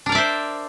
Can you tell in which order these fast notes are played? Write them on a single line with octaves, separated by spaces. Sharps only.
D4 A#4 D5 E5 C5